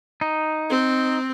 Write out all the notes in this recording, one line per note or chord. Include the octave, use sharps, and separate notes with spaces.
D#4
C4